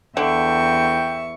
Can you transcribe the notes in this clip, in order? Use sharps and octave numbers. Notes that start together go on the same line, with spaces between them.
E2 D3 E5 G5 C#6